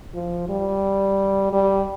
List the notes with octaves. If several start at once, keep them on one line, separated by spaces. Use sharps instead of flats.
F3
G3
G3